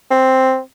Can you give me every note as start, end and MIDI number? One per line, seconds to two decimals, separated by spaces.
0.10 0.59 60